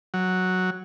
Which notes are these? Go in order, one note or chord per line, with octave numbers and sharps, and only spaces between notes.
F#3